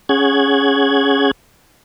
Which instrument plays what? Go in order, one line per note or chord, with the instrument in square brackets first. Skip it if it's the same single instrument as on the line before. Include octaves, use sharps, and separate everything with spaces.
[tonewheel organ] C#4 G#4 F#5 G#6